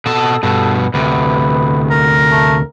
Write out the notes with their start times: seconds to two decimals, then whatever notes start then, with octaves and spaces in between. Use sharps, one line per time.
0.06 B2 A4 A5
0.43 G2 B2 A4
0.94 D2 C3 B4
1.90 A#4
2.32 A3